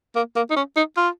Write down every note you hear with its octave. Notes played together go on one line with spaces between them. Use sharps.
A#3
A#3
D#4
C#4
D#4
F4